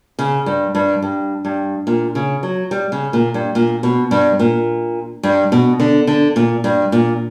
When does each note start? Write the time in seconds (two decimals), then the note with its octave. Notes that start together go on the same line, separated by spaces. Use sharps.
0.19 C#3
0.46 G2
0.75 G2
1.02 G2
1.45 G2
1.87 A#2
2.15 C#3
2.43 F#3
2.71 G3
2.92 C#3
3.13 A#2
3.34 G2
3.55 A#2
3.83 B2
4.11 G2
4.40 A#2
5.23 G2
5.52 B2
5.80 D3
6.07 D3
6.36 A#2
6.64 G2
6.92 A#2